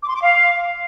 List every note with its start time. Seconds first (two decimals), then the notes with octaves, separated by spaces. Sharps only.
0.01 D6
0.08 C6
0.15 D6
0.22 F5